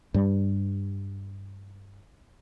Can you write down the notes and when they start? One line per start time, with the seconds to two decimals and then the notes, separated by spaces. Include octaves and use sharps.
0.14 G2 G3